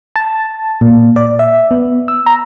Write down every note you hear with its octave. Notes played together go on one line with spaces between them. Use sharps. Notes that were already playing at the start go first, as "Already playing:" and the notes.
A5
A#2
D5
E5
B3
E6
A#5